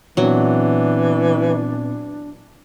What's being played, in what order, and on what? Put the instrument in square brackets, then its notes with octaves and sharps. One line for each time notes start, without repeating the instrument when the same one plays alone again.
[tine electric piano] A#2 B3 C4 [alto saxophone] E3 [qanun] F#3 [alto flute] D4